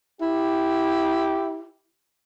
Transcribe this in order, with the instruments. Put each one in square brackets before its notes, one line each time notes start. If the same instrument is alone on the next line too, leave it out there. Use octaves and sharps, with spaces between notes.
[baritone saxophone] E4 [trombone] G4